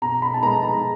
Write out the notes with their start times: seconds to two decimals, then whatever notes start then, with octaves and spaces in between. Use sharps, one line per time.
0.02 B2 A#5
0.22 B5
0.34 A5
0.43 G#3 B3 A#5
0.64 A#5